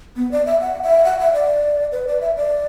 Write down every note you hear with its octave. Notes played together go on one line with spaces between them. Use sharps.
B3
D5
E5
F#5
E5
F#5
E5
D5
B4
D5
E5
D5